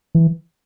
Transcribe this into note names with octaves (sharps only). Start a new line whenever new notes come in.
E3